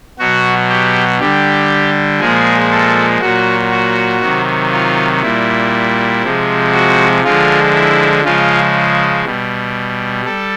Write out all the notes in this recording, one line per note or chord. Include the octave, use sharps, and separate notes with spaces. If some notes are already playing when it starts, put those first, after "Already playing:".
B2 F#3 F#4
G4
D3 G3 G4
A#2 F3 G#3 G#4
A4
A#2 F#3 F#4
F#4
C3 D#3 F#3
F4
A#2 G3 E4
C3 F3 G#3
F#4
D3 F3 G#3 F4
E4
C#3 F3 G#3 F4
B2 G3
G3 A4